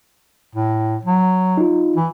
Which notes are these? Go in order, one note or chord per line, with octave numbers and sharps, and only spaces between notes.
A2
F#3
D#4 F4
E3